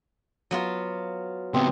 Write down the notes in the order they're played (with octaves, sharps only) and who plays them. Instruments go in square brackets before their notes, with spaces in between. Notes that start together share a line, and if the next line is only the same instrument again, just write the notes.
[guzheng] F#3 B3 F4
[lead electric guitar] C#2 B3 [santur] C4